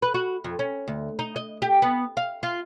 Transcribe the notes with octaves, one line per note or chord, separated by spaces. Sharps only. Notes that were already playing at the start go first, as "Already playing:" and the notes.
B4
F#4
F2
C#4
D2
D#4
D#5
G4
B3
F5
F4